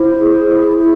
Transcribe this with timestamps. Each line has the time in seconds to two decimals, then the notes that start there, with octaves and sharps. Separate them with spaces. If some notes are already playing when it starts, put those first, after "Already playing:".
Already playing: E4 C5
0.19 G#4
0.49 E4
0.77 E4